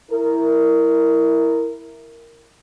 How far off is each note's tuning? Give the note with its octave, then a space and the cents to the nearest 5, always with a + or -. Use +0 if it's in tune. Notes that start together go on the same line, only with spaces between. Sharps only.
E4 +0 A#4 -5